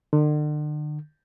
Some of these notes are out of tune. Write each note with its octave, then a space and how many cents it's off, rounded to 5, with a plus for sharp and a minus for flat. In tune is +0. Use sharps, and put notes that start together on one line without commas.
D3 +40